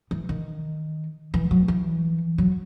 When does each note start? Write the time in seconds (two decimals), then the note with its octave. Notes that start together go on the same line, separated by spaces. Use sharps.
0.11 E3
0.29 D#3
1.34 E3
1.51 F#3
1.68 E3
2.38 F#3